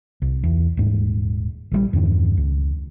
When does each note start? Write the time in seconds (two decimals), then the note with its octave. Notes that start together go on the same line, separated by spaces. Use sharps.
0.22 C2
0.43 E2
0.77 D#1 G#2
1.71 A#1 E3 G3
1.93 E2 G2 D#3
2.37 C#2